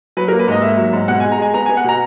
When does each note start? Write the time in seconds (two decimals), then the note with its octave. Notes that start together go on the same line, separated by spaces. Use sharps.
0.17 F#3 B4
0.28 A#4
0.32 A#3
0.39 B4
0.48 G#2 D#5
0.62 A#3 E5
0.77 F#3
0.93 G#2
1.08 B2 F#5
1.20 G#5
1.24 G#3
1.32 A#5
1.38 G#3 G#5
1.54 B3 A#5
1.66 G#5
1.69 B3
1.77 F#5
1.84 B2 A#5